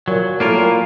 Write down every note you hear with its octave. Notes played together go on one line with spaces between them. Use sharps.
A#2 F#3
A2 A#3 F4 A#4
A#2